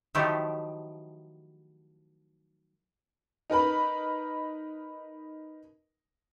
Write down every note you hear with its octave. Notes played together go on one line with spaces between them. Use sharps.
D#3 F3 F#3 A3 E4 G4
D#4 A#4 B4 B5